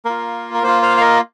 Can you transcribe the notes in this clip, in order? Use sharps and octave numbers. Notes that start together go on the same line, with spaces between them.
A#3 F4 A#4
A#4
A#3 F4 C5
C5 F5
F5
A#4 D#5